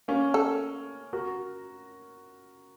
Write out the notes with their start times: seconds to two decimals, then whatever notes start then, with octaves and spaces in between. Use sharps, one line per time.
0.08 A#3 C#4
0.34 A4
1.13 F#4 A#4